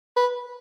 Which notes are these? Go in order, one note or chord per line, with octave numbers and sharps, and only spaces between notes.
B4